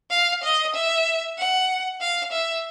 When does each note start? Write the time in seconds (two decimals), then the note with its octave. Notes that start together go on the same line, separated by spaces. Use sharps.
0.11 F5
0.43 D#5
0.74 E5
1.38 F#5
2.00 F5
2.32 E5